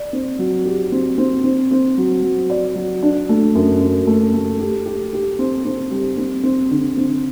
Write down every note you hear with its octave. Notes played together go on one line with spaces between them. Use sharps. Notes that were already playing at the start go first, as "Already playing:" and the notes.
Already playing: D5
C4
F#3
G4
C4
C4
C4
C4
F#3
F#3
D5
F#3
D4
A3
F#2
F#2
A3
A3
G4
G4
G4
C4
C4
G3
C4
C4
D3
C4